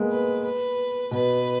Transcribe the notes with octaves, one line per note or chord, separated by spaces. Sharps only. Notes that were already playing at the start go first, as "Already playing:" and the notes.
Already playing: G#3 A#3 B3
B4
B4
B2 B4